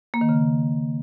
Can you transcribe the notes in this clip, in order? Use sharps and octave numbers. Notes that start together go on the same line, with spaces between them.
A#3
D#3
C#3